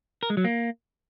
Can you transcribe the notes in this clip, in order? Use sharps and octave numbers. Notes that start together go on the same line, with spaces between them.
A#4
G#3
F#3
A#3